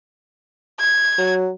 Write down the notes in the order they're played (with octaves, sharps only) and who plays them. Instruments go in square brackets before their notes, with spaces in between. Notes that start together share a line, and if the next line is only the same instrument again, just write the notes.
[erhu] G#6
[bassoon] F#3